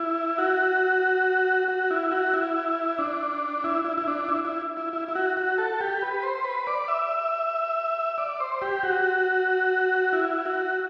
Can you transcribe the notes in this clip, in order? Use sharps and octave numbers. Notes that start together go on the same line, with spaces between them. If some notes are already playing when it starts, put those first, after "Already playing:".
Already playing: E4
F#4
F#4
E4
F#4
E4
D4
E4
E4
E4
D4
E4
E4
E4
E4
E4
F#4
F#4
A4
G4
B4
C5
B4
D5
E5
D5
C5
G4
F#4
E4
F#4